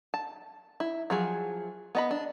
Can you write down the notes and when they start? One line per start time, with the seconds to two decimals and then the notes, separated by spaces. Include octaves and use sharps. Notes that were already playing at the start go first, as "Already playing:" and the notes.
0.14 A5
0.80 E4
1.10 F3 F#3 G#4
1.95 B3 D#5 B5
2.11 D4